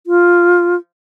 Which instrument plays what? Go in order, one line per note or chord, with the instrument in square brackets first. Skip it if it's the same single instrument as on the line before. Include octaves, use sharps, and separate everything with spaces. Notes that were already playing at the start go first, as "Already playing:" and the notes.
[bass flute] F4